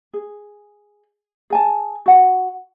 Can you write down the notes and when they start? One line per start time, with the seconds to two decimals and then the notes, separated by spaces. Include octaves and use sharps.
0.13 G#4
1.50 G#4 G#5 A5
2.06 F#4 F#5